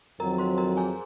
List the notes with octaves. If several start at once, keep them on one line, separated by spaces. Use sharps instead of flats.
F2 D#3 F#3 C4 A#4 A#5
C5 C6
A#4 A#5
G#4 G#5